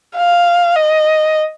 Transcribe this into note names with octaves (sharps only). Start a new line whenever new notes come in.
F5
D#5